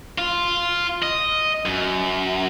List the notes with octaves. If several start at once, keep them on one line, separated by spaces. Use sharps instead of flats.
F4
D#5
F#2